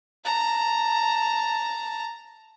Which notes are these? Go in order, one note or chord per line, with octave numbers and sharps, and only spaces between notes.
A5 A#5